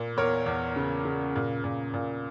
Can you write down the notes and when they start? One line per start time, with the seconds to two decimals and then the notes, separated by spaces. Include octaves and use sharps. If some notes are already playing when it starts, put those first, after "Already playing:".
Already playing: A#2
0.17 E2 A#4 C#5
0.46 E2
0.76 C#3
1.05 C#3
1.36 A#2
1.64 A#2
1.94 A#2